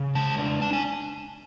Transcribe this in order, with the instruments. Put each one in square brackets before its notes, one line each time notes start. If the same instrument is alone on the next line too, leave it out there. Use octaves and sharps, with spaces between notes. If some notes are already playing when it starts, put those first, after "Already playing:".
Already playing: [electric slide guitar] C#3
G#3 A5
D4
D4 A5
G#5